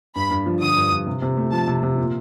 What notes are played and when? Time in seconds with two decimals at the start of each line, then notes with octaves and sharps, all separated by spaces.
0.16 G2 B5
0.31 G2
0.46 F3
0.61 D3 D#6
0.77 G2
0.91 G2
1.07 C3
1.22 C3
1.37 A3
1.52 F3 A5
1.67 C3
1.83 C3
1.98 A#2